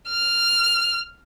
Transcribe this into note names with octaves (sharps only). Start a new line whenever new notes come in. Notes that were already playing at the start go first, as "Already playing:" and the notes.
F6